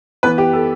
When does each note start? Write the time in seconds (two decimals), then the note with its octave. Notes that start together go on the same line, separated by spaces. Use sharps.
0.23 E3 B3 B4
0.38 G4
0.53 A4